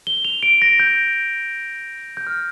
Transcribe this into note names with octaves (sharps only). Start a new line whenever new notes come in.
G7
F7
D7
A#6
G6
G6
F6